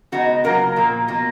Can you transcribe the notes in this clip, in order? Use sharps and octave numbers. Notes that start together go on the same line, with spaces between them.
C#3 G#3 B3 D#4 F#4
C#3 F#3 A#3 F4 A#4
A#2 F3 A#3
B2 A#3 F4